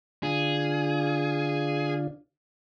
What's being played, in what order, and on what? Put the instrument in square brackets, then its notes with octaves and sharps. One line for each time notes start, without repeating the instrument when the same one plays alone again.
[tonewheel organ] D3 D4 F4 [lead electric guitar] G#4